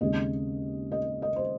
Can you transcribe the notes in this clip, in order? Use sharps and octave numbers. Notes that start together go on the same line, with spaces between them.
D#2 C#3 G#3 C4 D#5
D#5
D#5
C5